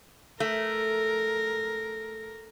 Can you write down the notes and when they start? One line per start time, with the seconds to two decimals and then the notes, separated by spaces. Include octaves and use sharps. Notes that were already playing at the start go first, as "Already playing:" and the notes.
0.40 A3 A#4